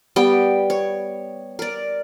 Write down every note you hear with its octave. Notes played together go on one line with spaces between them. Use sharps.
G3 B3 G4 G5
C#5
A#4 D5